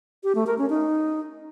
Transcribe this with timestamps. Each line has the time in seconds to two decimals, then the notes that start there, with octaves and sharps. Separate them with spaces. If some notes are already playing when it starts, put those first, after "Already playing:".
0.24 G4
0.35 A3
0.47 A#4
0.58 C#4
0.70 D#4